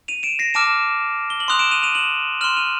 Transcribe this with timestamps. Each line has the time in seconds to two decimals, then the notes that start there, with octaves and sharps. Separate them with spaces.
0.08 D#7 F7
0.23 D7 E7
0.39 A#6 C7
0.54 A5 D6 F6 D7 E7
1.30 G7
1.40 F#7
1.48 C6 D#6 F#6 F7
1.59 D7 E7
1.71 D#7 F7
1.83 D#7 F7
1.95 E7 F#7
2.41 C6 F6 E7 F#7
2.57 D#7 F7